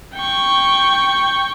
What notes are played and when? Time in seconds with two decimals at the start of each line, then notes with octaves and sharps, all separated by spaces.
0.15 G5 C#6